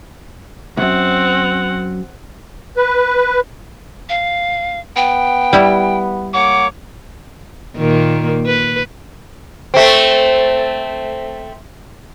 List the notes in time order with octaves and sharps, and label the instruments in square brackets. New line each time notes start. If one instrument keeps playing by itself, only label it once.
[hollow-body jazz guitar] C2 F#2 [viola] C4 [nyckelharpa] F#5
[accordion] B4
[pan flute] F5
[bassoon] B3 [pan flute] G5
[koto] G3 E4
[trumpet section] A#3 C#5 D6 [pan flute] F#5
[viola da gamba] A#2 D#3 A#3
B4
[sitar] A3 C4